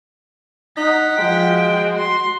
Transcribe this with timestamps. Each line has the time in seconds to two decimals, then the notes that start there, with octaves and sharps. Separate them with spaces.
0.77 D#4 F#5 B6
1.18 F3 G#3 G5
1.47 F#4
1.98 C6